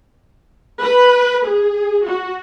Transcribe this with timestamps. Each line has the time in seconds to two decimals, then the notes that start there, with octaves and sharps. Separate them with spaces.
0.81 B4
1.45 G#4
2.04 F#4